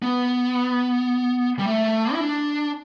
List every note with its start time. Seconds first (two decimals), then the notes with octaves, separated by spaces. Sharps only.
0.02 B3
1.59 G3
1.66 A3
2.13 E4
2.21 D4